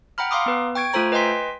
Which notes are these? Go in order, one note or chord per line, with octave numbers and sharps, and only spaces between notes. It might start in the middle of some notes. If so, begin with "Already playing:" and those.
F#5 G5 A#5 B5 F6
F5 A#5 C6 D6 D#6
B3 B4
G5 C#6 G#6 D7
A3 F4 A4 C5 A#5 G#6
B4 D#5 G5 G#5 C6 B6